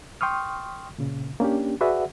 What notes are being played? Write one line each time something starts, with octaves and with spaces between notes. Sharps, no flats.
G5 C6 C#6 D#6 F6
A#2 C#3
A#3 C#4 D4 G4
F#4 G#4 B4 D5 E5 F#5